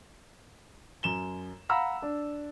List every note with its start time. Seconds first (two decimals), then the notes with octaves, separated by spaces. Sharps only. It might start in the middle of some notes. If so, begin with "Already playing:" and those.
1.03 F#2 E7 G7
1.69 F5 F#5 A#5 B5 E6
2.02 D4